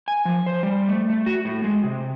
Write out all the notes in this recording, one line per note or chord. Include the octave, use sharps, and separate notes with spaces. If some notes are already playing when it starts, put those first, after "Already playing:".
G#5
F3
C5
G3
A3
A3
F#4
A2
G#3
C3